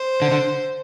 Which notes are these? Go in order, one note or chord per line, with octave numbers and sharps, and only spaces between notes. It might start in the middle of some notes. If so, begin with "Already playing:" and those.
Already playing: C5
D3
D3